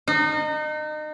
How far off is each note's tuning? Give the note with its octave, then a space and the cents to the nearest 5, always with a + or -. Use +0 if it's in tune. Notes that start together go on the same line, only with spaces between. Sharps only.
D#4 -30